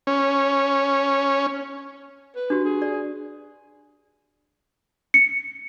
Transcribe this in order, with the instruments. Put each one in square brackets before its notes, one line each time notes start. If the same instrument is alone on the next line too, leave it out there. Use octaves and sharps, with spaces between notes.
[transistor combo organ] C#4
[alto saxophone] B4
[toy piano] D4 F#4 G4
[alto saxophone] G#4
[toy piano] D5
[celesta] C#7